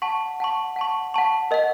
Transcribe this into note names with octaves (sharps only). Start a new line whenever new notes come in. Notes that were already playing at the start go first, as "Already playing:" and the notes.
F#5 A5 C#6
F#5 A5 C#6
F#5 A5 C#6
F#5 A5 C#6
A#4 D#5 F#5